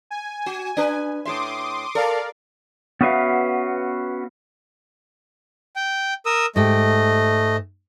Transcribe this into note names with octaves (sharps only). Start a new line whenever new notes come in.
G#5
F#4
D4 B4
A2 G4 E5 C6 D6 D#6
A4 A#4 D5 F5
B3 C#4 F#4 B4 E5 F5
G5
A#4 D#6 E6
G#2 A3 G4 D#5 G5